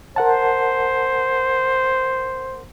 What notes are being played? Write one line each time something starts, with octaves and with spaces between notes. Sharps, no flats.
A#4 C5 F#5 A5